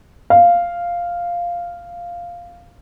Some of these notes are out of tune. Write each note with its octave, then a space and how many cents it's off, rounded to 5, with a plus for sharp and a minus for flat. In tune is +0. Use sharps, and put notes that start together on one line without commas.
F5 -5